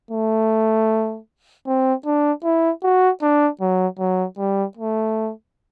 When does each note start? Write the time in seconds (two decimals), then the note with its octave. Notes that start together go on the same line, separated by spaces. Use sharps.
0.11 A3
1.67 C4
2.06 D4
2.44 E4
2.83 F#4
3.22 D4
3.60 F#3
3.99 F#3
4.38 G3
4.77 A3